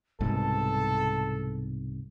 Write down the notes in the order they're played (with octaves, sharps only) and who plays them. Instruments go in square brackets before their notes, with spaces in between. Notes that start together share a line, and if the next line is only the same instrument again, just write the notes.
[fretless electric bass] C2 G#2 B2 [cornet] A4 [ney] A5